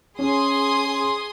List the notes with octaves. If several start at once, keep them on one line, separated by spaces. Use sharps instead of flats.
C#4 G#4 C6 D#6